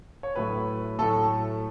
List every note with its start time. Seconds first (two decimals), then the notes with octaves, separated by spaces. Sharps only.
0.23 C#5
0.35 A2 F#3 A3 B4
0.99 A2 F#3 A3 A4